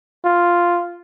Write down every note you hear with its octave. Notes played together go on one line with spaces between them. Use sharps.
F4